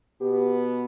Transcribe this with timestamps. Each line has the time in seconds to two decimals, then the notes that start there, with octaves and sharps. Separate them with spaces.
0.20 B2 B3 G4